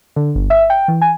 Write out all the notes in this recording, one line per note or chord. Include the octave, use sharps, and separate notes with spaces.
D3
G1
E5
G5
E3
G#5